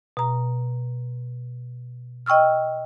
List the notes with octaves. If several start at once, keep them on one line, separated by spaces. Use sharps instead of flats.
B2 A#5
D#5 G5 C#6 E6 F6